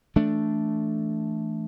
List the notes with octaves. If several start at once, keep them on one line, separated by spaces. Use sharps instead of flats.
E3 A3 D4